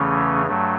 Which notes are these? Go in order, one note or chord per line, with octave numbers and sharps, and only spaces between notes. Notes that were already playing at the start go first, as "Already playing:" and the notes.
Already playing: E2 C#3 E3 A3 C#4
G2 F#3 A3